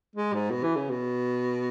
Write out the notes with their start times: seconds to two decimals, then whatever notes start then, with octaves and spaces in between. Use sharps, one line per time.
0.16 G#3
0.34 G#2
0.51 B2
0.63 E3
0.76 C#3
0.90 B2